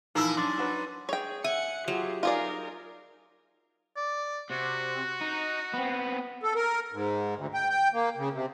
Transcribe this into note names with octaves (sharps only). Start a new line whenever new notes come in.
A#1 E3 D#4 E4 A#4 E6
F#2 D4 C6 D6 A6
D4 F#4 B4
G#4 C#5 G5
E5 F#5 G#5 C#7
F#3 F4 G4 G#4
D#4 F4 G#4 A#4 D5
D5
C3 F#4
D#4
B3 C4
A4
A#4
G#2
D2
G5
G5
A#3
C#3
C3